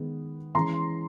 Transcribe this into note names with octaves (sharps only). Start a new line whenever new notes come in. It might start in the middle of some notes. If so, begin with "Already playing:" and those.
Already playing: D#3 G#3 B3
E3 G#3 C#4 A#5 C6